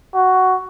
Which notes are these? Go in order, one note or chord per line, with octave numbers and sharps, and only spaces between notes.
F#4